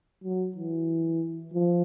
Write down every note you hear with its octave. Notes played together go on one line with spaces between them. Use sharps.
F#3
E3
F3